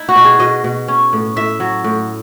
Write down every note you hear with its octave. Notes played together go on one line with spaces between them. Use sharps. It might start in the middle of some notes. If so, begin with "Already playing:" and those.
Already playing: D#4 E4
F#4
B2
G#4
B2 D#5
B2
C#4
A2
A2 E5
F#3
A2